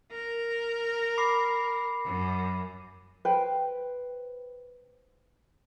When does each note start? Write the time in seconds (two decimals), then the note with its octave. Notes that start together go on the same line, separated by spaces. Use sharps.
0.12 A#4
1.18 B5 D6 C7
2.04 F#2
3.25 B4 C5 G5